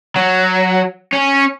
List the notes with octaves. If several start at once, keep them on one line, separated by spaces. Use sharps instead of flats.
F#3
C#4